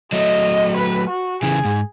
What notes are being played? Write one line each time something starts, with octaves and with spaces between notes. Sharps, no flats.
F#3 A3 D#5
B4
F#4
C#3 E3 G#4
G#2